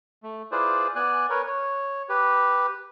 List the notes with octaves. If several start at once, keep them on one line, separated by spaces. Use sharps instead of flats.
A3
E4 F4 G#4 B4 C5 D5
B3 D5 G#5 F#6
A#4 B4 C#5
C#5
G4 B4